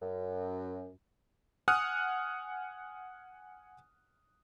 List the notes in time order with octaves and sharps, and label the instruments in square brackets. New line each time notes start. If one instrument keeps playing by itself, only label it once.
[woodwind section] F#2
[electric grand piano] F#5 G#5 D#6 F6 F#6